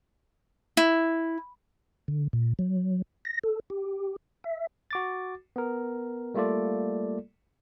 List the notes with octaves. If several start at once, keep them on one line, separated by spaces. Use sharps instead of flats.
E4
D3
A#2
F#3
A#6
A4
G4
E5
F#4 D6 A6
B3 A#4
G3 A3 A#3 F4 A4 D5